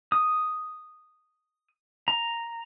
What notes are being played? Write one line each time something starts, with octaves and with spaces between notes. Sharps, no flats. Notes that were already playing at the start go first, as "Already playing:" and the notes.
D#6
A#5